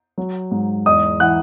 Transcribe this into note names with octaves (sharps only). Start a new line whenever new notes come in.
F#3
G#2
E2 D#5 D#6
E3 F#5 F#6